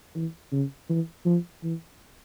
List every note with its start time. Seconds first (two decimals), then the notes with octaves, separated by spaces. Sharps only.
0.16 E3
0.52 C#3
0.90 E3
1.26 F3
1.63 E3